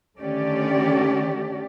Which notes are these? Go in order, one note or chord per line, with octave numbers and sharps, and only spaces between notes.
D3 D#3 A3 C#4 G4 D5